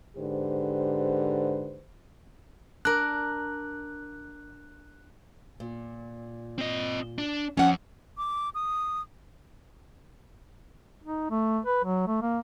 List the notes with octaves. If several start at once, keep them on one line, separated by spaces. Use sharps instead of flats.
G#2 D3 G4 B4 C5
D4 A#4 F#6
A#2
C4 D#5
D4
F2 C#4 F#5
D6
D#6
D#4
A3
B4
F#3
A3
A#3